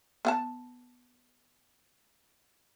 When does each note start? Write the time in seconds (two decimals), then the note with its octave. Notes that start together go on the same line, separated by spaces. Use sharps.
0.25 B3 F#5 A5